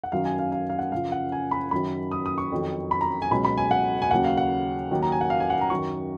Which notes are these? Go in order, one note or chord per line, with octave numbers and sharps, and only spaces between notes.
F#5
F#2 D#3 F#3 F5
G#5
F5
F5
F5
F#5
F#2 C#3 F3 F5
F#5
G#5
B5
F#2 D#3 F#3 B5
D#6
D#6
C#6
F2 D#3 F#3
B5
A#5
G#5
C#2 B2 F#3 B5
B5
G#5
F#5
G#5
D#2 C#3 F#3 F#5
F5
F#5
D#2 D#3 F#3
A#5
G#5
F#5
F5
G#5
F#5
A#5
F#2 D#3 F#3 C#6